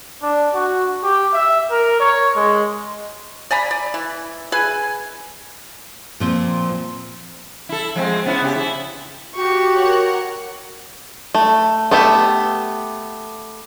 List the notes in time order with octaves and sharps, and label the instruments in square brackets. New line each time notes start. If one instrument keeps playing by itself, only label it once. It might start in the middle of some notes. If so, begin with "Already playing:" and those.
[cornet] D4
F#4
G4
E5
A#4
C#5
G#3
[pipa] D5 G#5 A#5 B5
D5
E3
G#4 B4 E5 G#5
[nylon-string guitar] A#2 F3 C4
[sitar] E4 A4
F3 G#3 C4
B3 C#4 E4
C#3 G4
E4
[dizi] F#4 [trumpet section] G4 [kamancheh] C#6
[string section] A#4 F#5 [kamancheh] C#5
[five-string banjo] A3
A3 B3 G4 E5